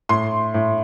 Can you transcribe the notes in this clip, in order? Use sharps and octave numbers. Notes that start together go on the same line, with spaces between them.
A2 C6
A2